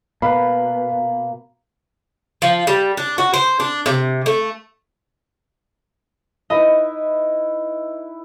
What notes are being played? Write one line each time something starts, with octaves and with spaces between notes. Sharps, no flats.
B2 A#3 B4 F5 B5
F3
G3
D4
F#4
C5
D4
C3
A3
D#4 E4 B4 D#5